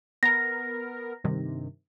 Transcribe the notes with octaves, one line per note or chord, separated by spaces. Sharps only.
B3 A#4 A#6
G2 C3 D#3